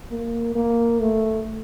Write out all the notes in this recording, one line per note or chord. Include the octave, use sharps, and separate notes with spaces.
A#3
A#3
A3